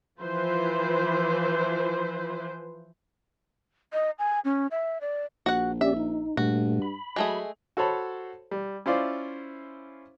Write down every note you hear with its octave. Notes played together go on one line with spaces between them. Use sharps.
E3 F3 E4 B4 C5
D#5
G#5
C#4
E5
D5
A#1 F#4 F#5
C#4 G4 D5 E5
D#4
G2 A#2 A3 F#4
B5
F#3 G#3 A3 G#4
F#4 A4 C5 C#5 A5 B5
G3
C#4 E4 F4 C5 D5